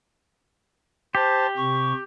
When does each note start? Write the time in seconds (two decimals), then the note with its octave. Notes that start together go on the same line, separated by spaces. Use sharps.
1.15 G4 C5 A5
1.57 C3 C#6